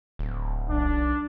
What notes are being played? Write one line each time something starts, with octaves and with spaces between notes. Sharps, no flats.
D1
B1 D4